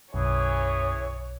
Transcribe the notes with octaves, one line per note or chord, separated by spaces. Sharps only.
B1 F#2 E3 G#4 C#5